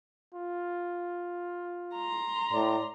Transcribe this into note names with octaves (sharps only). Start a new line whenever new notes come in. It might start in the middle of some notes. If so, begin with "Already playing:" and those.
F4
A#5 C6
A2 D5